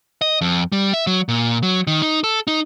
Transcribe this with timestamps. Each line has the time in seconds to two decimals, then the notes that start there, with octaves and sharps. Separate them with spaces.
0.22 D#5
0.41 F2
0.72 G3
0.94 E5
1.07 F#3
1.29 A#2
1.63 F#3
1.87 D#3
2.02 D#4
2.24 A4
2.47 D#4